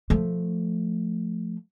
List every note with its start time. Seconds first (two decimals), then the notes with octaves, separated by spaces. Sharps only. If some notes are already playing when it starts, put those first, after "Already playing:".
0.10 F3 A3